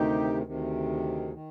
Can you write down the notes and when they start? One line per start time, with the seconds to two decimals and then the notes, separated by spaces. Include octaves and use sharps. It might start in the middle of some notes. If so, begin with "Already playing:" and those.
Already playing: D2 C3 D#3 D#4 G4
0.46 D2 C3 D#3
1.33 D#3